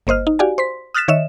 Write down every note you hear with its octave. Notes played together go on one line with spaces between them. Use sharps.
G1 A#3 C5 D#5 F6
D#4
F#4 G4 D5 F5 G#5
C5 C6 B6
D#6 F6 F#6 A6 B6 E7
D#3 C#5 D#5 E5 E7